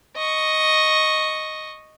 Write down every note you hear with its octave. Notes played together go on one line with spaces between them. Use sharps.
D#5 C#6